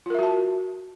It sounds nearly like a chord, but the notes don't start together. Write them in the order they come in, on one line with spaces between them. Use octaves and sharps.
F4 A#4 E5 F#4 A5